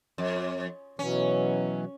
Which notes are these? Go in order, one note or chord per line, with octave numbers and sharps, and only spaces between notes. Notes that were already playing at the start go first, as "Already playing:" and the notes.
F2
B2 E3 F#3 C#4